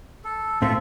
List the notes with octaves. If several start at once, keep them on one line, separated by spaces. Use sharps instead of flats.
A4
A2 A3 C4 F4 A4 E5